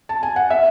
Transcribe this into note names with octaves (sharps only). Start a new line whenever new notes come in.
A5
G#5
F#5
E5